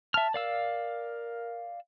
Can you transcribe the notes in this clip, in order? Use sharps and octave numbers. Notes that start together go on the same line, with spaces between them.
E5 A5 F6
A#4 D5 F5 E6